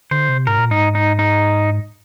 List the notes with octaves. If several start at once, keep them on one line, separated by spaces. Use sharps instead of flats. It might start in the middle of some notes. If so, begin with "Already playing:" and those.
D3 C5
C3
G#2 A#4
A#2
G#2 D#4
D#4
D#4